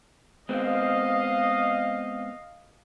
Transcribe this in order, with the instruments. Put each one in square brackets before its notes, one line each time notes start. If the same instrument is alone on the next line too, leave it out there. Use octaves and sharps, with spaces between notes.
[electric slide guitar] G#3 B3 C4 [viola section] D#5 F5